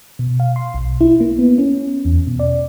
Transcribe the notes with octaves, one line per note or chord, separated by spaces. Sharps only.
B2
F5
C6
B1
E4
A#3
B3
C#4
E2
B2
D5